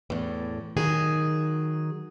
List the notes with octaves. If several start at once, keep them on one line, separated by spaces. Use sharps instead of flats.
E2 A2
D#3 F#3 G#4